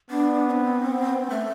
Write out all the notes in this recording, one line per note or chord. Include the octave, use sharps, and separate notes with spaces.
B3 D4
C4
A3